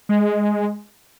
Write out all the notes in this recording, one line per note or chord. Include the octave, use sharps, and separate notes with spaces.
G#3